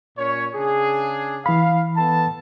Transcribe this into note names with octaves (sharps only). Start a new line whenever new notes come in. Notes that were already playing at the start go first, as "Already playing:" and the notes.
A#2 C#4 C#5
C#3 D4 G#4
E3 F5 B5
B3 A4 A5